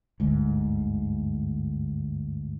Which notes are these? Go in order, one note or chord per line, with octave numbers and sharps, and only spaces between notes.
G1 D2 G#2